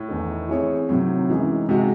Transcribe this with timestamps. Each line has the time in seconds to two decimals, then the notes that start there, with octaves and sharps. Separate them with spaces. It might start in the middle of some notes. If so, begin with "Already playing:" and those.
Already playing: A2
0.08 E2 D#3 A3 D#4 A4
0.49 E3 C4 E4 G#4 C#5
0.89 A2 C3 D#3 F#3 C4
1.29 F#2 E3 G#3 D#4 G#4
1.69 C3 G#3 D#4 F#4